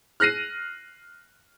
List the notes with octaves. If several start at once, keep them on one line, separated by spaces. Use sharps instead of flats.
F6 F#6 A#6 C7 D#7